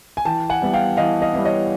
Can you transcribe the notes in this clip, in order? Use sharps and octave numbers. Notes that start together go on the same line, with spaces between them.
G#5
E3 G5 A5
F#5 G#5
G3 B3 E4
F5 G5
E3 D#5 F5
D#5 F5
G3 B3 E4
C#5 D#5